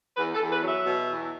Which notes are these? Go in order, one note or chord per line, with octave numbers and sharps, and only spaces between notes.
E2 B4
A4
E2
B4
F#3
E5
B2
E2